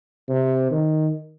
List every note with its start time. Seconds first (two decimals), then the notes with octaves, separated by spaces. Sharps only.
0.29 C3
0.71 D#3